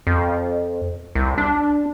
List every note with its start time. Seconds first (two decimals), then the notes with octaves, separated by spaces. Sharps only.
0.07 F2
1.15 C2
1.38 D4